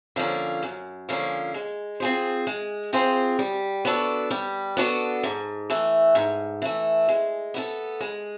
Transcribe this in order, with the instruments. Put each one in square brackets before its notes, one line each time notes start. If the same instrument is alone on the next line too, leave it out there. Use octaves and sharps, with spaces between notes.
[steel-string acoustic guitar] D3 F3 A#3 C#4
F#2
D3 F3 A#3 C#4
G#3
C4 F4 G#4 C5
G#3
C4 F4 G#4 C5
G3
B3 D4 F#4 A4
G3
B3 D4 F#4 A4
G#2
E3 A3
G#2
E3 A3
G#3
B3 E4 A4
G#3